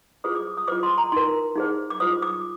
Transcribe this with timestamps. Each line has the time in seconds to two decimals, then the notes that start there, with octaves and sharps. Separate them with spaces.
0.24 F4 G#4 C5 D#6
0.35 D6
0.57 D#6
0.68 F4 C5 D6
0.83 C6
0.98 A#5
1.12 D#4 A#4 C6
1.56 D#4 G#4 C5
1.90 D6
2.00 F4 C5 D#6
2.22 D6